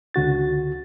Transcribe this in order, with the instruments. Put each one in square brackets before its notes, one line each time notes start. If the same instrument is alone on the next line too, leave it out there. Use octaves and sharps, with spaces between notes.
[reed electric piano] C#2 D3 F#4 A6